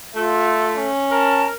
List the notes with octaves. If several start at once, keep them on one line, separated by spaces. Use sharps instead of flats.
A3 F4 E5
C#4
A#4 A5